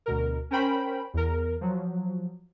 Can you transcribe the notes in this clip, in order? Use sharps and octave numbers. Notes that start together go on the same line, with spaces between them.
D2 B2 A#4
C#4 A#4 C5 G5 B5
E2 A#4
F3 F#3